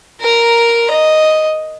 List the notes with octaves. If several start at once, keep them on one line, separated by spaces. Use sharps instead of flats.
A#4 A#5
D#5